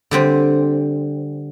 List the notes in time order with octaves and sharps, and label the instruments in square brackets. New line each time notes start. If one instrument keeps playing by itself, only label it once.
[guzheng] D3 G3 C4